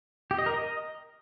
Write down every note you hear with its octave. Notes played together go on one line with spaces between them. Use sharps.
G4
D#5
A#4
D#5